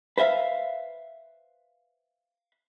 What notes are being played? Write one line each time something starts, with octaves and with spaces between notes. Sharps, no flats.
B4 C5 E5 F5